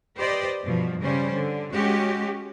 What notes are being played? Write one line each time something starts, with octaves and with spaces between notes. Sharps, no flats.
G4 B4 C5 D5 D#5
G2 B2 F3
C#3 G3 C#4 C5
D3
G#3 C#4 F#4 G4